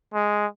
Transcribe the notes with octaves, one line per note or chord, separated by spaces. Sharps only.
G#3